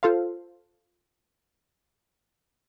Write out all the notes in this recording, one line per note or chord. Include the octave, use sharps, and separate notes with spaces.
F4 A4 C5 F5